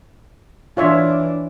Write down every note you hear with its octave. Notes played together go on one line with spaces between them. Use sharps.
E3 D4 F4 C#5 E5